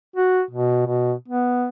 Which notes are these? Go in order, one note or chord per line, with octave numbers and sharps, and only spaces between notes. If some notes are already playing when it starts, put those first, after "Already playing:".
F#4
B2
B2
B3